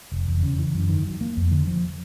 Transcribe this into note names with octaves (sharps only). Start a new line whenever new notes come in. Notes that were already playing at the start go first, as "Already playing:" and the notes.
F1
E2
C#3
E3
F#2
D#3
F#3
A#3
F2
D3
F3